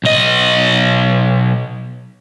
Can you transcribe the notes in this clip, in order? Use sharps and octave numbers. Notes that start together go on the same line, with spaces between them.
B1 D#5